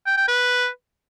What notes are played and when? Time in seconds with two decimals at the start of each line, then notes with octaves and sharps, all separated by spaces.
0.06 G5
0.17 G5
0.28 B4